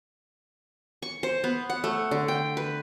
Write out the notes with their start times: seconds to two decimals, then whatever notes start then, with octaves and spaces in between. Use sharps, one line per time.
1.02 C#6
1.23 C5
1.44 B3
1.70 F#5
1.84 A3
2.11 D3
2.28 G5
2.57 B4